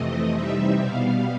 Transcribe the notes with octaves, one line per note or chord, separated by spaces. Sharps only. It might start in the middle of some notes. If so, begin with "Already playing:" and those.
Already playing: F2 C3 E3 A3 C4 D#5
C3 E3 G3 C4 D#4 E5
B2 G3 B3 F5